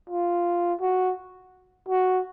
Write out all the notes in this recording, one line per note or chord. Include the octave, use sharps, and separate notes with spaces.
F4
F#4
F#4